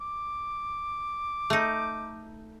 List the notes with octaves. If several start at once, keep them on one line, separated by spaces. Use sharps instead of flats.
D6
A3 D#4